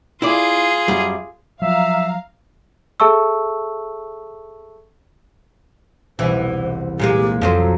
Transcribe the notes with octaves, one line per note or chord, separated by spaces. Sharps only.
E4 F4 G#4 D5
F#2 G3
F3 F#3 E5 F5 A#5
G#4 A4 E5 A5 C#6 E6
E1 C2 E3 B3 C5
A#2 G#3 A#3 G4
F2 F3 F#3 A4 C5